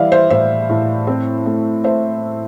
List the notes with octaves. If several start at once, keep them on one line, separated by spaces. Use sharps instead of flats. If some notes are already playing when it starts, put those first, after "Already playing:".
Already playing: E3 G3 D5 E5 F5
C5 E5
A2 C5 E5
A2
C4
A3
A3 C5 E5